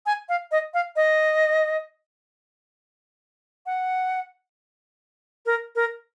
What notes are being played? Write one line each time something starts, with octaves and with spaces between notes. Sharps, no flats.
G#5
F5
D#5
F5
D#5
F#5
A#4
A#4